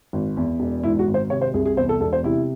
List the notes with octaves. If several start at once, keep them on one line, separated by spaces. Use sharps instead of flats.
G#1
E2
E1
G#2 E4
F#4
G#1
C5
C3 C#5
C5
C2 G#4
G#4
E2 C5
A4
E1 A4
C5
C3 E4